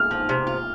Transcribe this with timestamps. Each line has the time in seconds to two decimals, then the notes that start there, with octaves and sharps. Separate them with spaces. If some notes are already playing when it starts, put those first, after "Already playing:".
Already playing: F6
0.11 F3
0.29 C3
0.47 F4